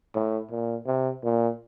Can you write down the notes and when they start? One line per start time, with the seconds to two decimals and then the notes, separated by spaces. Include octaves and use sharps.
0.15 A2
0.51 A#2
0.86 C3
1.23 A#2